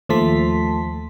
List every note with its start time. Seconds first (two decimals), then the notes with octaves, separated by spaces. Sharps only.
0.09 D#2 F3 A3 A5 C6 B6